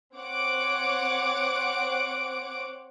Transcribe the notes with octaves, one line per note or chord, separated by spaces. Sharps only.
C4 C#5 F#5 D6 D7